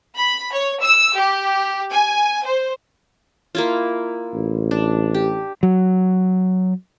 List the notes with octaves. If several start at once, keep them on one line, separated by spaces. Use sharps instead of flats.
B5
C#5
E6
G4
G#5
C5
A#3 E4 F4
A1
D4
G4
F#3